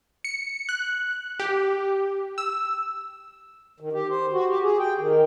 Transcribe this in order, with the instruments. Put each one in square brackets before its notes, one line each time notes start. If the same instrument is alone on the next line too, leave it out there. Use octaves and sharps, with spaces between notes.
[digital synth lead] C#7
F#6
G4
E6
[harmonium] D#3
G4
C5
F#4
G4
G#4
G5
D#3